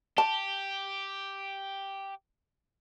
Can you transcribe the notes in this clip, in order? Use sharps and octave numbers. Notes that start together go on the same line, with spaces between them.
G4 A5